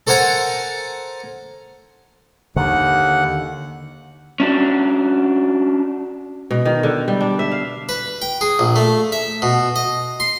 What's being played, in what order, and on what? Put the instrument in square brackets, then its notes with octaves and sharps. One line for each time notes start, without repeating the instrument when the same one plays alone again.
[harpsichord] A4 A#4 C5 F#5 G#5 A#5
[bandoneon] D#2 F#5 [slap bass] D3 D#3
[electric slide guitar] C#4 D4 F#4
[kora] B2
D#3
D3
G3
D4
E5
F5
[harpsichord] B4
G5
G#4
A#1
A3
E5
B2
D#5
C6